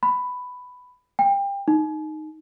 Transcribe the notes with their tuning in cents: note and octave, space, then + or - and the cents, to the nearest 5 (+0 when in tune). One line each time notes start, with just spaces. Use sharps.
B5 +10
G5 +25
D#4 -5